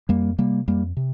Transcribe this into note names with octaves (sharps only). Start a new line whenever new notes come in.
F2 G3 A#3
C3 G3 A#3
F2 G3 A#3
C3